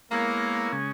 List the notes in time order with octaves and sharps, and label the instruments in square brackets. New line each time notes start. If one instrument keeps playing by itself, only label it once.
[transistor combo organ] G#3 B3 E4 A#4 C#5 [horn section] A#3
[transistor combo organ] C#3 G#3 C#4